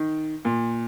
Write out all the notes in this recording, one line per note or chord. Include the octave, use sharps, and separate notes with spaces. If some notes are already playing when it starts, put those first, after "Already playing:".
Already playing: D#3
A#2